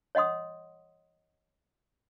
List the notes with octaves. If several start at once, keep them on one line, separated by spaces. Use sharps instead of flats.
C#5 D#5 F#5 C6 D#6